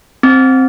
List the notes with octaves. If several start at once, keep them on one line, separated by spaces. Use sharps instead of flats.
C4